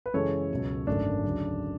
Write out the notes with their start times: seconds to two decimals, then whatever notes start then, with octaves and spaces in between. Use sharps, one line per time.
0.06 B4
0.14 F#2 C#3 E3 G#3 C#4 A4 C#5
0.51 C#2 B2 F#3
0.87 G#1 F#2 D3 A3 D4
1.24 D2 C#3 F#3